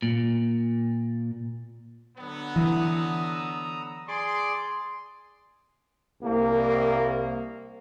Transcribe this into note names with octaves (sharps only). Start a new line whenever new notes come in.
A#2
D3 F#3 B3
E3 A#5 D#6 E6
G#4 D5 C6 D6
C2 A#3